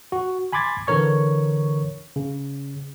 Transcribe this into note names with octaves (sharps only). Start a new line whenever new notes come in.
F#4
G#5 B5 C6 D6 G#6 A6
D3 E3 A#4 C#5 C#6
C#3